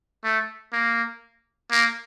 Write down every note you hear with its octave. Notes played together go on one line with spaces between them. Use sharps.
A3
A#3
A#3